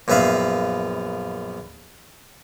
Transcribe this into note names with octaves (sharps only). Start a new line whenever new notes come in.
A#1 F#2 B3 E5 F5 B5